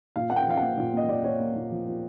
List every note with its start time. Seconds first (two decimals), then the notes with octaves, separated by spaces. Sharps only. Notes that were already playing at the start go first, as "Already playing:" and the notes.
0.16 A#2 F5
0.30 A#3 F#5
0.36 G5
0.47 F3 F5
0.57 A#3 F#5
0.78 A#2
0.93 A#3 D#5
1.09 A#2 D5
1.24 A#2 C#5
1.40 A#3
1.55 A#2
1.71 F3
1.87 F3